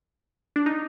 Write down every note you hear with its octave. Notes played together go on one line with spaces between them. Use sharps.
D4
D#4